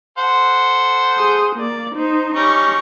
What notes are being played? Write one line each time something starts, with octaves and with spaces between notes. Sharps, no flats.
A4 C5 F#5
G#4 D#6
A#3 D5
D#4 C5
G3 C#4 D#4 C#6